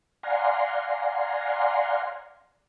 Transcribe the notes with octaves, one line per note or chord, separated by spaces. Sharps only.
D5 F5 F#5 G#5 A#5 C6